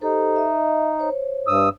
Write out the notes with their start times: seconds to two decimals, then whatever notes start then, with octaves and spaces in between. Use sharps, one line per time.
0.01 D#4 G4 A4 C5
0.36 D#5 E5
0.99 C5 C#5
1.47 G2 D#6 E6